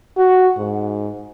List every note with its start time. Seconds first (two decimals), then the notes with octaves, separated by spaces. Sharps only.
0.17 F#4
0.57 G#2